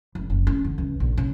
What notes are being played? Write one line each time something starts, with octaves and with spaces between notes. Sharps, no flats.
F#1
F#1
C#4
D3
C#2
A#1
C#3